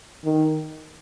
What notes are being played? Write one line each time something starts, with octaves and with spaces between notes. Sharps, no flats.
D#3